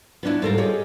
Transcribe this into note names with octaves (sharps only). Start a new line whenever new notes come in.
B3 C#4 D4 E4 F4
G#2 G3 F4 A4 A#4
F4 G4 G#4 C#5 D#5